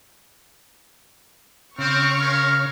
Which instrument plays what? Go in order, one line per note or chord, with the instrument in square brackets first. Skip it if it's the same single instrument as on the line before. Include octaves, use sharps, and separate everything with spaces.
[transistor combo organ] C#3 [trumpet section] C4 [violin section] C#6 F6
[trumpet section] C#4 A#4 F5